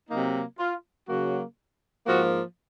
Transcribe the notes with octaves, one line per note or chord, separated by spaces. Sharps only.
C3 F#3 A#3 D#4
F4
C#3 F#3 A#3 F#4
G#2 F3 A#3 F#4